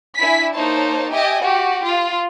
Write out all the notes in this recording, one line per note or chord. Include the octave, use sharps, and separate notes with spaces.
D4 E4 G#5 B6
A#3 D#4 C5 C#5 A5
G4 D#5 E5 G5 G#5
F#4 G4
F4